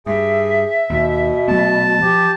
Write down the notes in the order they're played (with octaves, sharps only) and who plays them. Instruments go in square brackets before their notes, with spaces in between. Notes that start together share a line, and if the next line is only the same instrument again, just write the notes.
[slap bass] G2 [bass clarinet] G#4 [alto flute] E5
[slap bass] D#2 [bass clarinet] B2
[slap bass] F#3 A3 B3 [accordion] A5
[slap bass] F3 [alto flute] G4